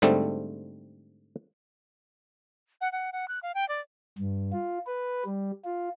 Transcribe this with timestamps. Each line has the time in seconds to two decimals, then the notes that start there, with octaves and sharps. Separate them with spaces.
0.02 G#2 D3 G3 A3 C4
2.81 F#5
2.92 F#5
3.13 F#5
3.28 F#6
3.43 F5
3.55 G5
3.69 D5
4.18 G2
4.53 F4
4.87 B4
5.25 G3
5.65 F4